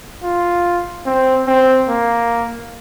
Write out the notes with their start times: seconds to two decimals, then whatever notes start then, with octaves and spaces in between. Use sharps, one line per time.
0.24 F4
1.06 C4
1.47 C4
1.88 A#3